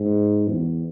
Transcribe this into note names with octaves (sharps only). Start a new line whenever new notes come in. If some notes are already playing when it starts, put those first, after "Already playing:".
Already playing: G#2
E2